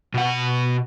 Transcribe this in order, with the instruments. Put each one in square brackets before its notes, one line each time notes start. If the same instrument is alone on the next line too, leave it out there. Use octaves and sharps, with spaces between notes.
[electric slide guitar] B2 F#5